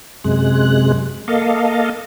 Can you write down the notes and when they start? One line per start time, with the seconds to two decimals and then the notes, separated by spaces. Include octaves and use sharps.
0.24 F#2 C3 G#3 F#6
1.28 A#3 A4 D#5 F5